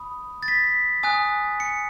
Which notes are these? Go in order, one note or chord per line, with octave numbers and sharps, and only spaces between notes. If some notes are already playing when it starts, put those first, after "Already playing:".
Already playing: B5 D#6
A6
B6
G#5 D#6 F#6
C#7